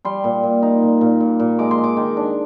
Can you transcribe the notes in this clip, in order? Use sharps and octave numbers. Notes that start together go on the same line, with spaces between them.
G3 C6
A#2
A#2
D#4
A#2
A#2
A#2
A#2
G#3 D6
C6
G#3
D6
D#3
D4